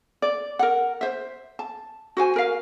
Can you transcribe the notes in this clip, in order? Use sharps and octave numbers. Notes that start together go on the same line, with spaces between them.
D5
A#4 F#5
C5 E5
A5
F#4 C5 G#5
A#4 F5